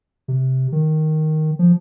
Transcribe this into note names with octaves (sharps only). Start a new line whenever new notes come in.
C3
D#3
F3